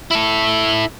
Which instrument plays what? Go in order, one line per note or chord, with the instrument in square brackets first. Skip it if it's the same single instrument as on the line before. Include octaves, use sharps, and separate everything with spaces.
[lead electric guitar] E4 A4